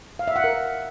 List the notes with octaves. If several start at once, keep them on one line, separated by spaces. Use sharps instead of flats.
F5
E5
F#5
A#4